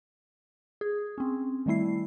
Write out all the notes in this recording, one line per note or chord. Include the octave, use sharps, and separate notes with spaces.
G#4
C4 C#4
D#3 G3 A3 E4 C7